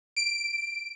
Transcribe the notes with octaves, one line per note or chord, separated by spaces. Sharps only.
D7